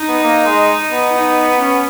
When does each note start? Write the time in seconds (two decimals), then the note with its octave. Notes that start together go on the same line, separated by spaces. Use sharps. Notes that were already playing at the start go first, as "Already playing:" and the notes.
Already playing: D#4
0.09 B3
0.24 A#3
0.46 G#3
0.91 B3
1.15 D#4
1.60 C#4